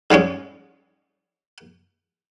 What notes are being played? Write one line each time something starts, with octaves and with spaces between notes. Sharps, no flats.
G#2 G3 G#3 C#4